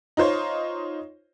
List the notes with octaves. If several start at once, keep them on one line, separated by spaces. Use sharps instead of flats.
D#4 F4 C5 C#5